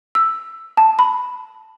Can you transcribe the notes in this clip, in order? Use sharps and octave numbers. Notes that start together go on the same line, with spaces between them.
E6
A5
B5